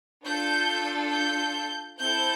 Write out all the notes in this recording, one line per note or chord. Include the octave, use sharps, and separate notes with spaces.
D4 F4 A4 G6
G6
C4 E4 A4 G6